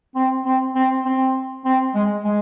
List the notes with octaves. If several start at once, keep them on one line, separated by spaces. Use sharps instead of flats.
C4
C4
C4
C4
C4
G#3
G#3